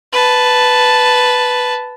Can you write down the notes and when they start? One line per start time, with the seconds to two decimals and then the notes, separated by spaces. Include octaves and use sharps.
0.12 B4 A5